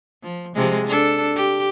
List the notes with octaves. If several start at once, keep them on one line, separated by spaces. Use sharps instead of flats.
F3
C3 F3 G#3
D4 A4
G4